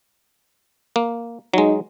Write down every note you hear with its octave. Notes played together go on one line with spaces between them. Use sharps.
A#3
F#3 G#3 D#4